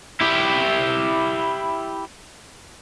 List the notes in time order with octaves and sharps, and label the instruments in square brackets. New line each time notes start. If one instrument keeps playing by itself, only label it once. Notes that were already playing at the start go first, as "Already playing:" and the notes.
[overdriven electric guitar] E4 G4